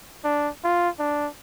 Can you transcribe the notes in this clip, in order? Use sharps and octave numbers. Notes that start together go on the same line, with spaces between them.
D4
F4
D4